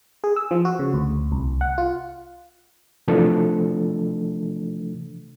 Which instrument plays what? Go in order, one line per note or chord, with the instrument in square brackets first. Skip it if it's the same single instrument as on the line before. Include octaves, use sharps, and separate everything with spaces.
[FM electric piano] G#4
E6
F3
F#4
C#3
D2
C2
F#5
F4
[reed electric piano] C3 E3 F3 A3 D4 A4